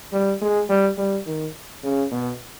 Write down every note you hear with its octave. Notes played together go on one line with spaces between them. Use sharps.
G3
G#3
G3
G3
D#3
C#3
B2